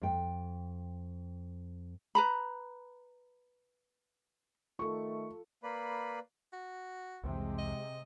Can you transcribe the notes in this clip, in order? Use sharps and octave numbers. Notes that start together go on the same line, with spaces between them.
F2 G5
B4 A#5 B5
D#3 A3 F4 A4 C#6
A#3 B4 D5 B5
F#4
C2 F2 C3 E3 G#3
D#5